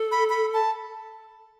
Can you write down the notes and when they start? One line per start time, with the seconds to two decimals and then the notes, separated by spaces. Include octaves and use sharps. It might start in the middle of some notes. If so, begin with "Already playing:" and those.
Already playing: A4
0.12 B5
0.30 B5
0.54 A5